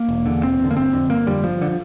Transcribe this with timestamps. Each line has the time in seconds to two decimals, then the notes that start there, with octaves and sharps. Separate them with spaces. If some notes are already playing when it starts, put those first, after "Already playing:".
Already playing: A#3
0.08 E1
0.26 E2 D3
0.43 E1 C4
0.59 E2
0.64 D3
0.71 A#3
0.76 G1 C4
0.93 F2 D3
1.10 G1 A#3
1.27 F2 D3 G3
1.43 G1 F3
1.61 D3